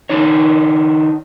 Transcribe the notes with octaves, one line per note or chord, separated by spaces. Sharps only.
D#3 D4 D#4 C#5